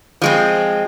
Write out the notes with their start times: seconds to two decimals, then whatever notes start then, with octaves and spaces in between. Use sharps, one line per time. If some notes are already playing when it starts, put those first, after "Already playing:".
0.22 F3 G#3 C4